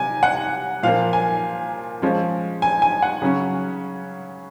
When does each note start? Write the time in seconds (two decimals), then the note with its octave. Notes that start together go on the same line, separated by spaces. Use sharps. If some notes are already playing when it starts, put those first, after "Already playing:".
Already playing: C3 G#5
0.23 F#5
0.83 A#2 F3 A#3 F5
1.13 G#5
2.02 F3 G#3 C#4
2.62 G#5
2.82 G#5
3.02 F#5
3.22 C#3 F#3 C#4